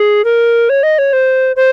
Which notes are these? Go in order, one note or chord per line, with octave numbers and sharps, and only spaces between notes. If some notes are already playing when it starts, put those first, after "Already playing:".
Already playing: G#4
A#4
C#5
D#5
C#5
C5
C5